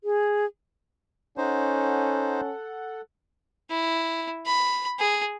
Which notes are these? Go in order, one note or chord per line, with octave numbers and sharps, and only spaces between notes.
G#4
C#4 D#4 A4 C5 F#5
E4
B5
G#4